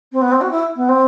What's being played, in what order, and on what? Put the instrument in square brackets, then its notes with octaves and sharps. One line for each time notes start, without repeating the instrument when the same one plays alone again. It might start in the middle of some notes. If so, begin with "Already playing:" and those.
[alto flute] C4
B3
C4
F#4
E4
B3
C4